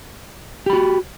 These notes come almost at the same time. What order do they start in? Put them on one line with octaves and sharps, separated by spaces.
G4 B5 F#4